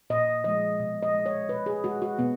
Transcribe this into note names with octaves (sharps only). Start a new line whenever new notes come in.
A#2 D#5
F3 G#3 D#5
B2
D#5
G#3
C#5
B2 B4
G#4
G#3 F#4
F#4
B2 B3